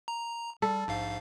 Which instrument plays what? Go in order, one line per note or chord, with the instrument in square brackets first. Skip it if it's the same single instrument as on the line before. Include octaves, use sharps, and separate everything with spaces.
[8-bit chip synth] A#5
[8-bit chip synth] G3 [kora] A4
[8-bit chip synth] A#1 G#2 F5